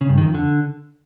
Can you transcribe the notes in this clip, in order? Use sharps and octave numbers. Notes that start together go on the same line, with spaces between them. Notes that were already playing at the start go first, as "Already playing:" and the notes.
C#3
G2
D#3
F2
D3